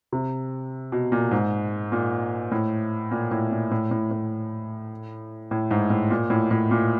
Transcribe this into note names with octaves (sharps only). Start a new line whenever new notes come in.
C3
B2
A#2
G#2
A#2
A2
A#2
A2
A#2
A2
A2
A2
A2
G#2
A2
A#2
A2
A2
A#2